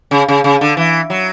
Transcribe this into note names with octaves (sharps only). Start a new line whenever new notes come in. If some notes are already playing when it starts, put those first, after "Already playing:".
C#3
C#3
C#3
D3
E3
F#3